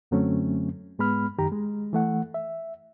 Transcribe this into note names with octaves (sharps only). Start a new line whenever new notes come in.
F#2 D3 F#3 A3 C4 C#4
G#2 G#3 B3 B5 F6
F#2 D#3 G4 A#5
G#3
E3 A3 F#5
E5